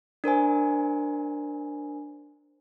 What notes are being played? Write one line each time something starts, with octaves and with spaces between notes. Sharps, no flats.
D4 A#4 C5 G#5